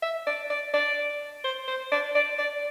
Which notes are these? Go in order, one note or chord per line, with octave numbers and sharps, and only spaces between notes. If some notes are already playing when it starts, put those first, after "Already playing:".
E5
D5
D5
D5
C5
C5
D5
D5
D5